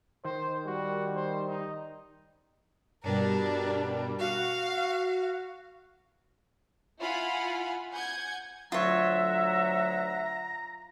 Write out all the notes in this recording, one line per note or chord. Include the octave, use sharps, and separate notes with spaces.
D#3 C5
G3 F#4
C5
D#4
G2 B2 G3 D4 A#4
F#4 F5
E4 F4 F#5 G#5 B5
F#5 G#5 G6 G#6
D2 F#3 F4 C#5 E5 F#5 A#5